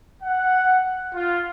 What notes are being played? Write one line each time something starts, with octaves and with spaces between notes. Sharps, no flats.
F#5
F4